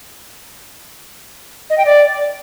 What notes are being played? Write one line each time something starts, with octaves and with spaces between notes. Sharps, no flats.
D#5
G5
D5